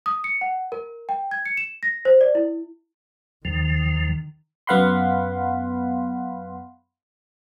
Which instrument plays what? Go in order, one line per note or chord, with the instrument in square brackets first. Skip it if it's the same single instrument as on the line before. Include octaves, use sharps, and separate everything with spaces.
[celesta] D#6
C#7
F#5
A#4
G5
G#6
C#7
E7
A#6
C5
D5
E4
[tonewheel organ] D#2 F3 [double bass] D#3
[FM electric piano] F#2 B3 F5 F#5 B5 C6